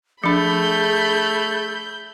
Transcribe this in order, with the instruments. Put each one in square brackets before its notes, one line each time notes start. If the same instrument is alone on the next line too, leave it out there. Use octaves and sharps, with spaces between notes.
[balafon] F3 D4 [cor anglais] A3 [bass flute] G#4 [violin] B5 G6